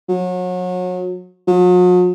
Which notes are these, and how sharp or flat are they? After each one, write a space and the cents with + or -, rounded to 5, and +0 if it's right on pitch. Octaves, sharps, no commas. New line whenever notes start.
F#3 -30
F#3 -45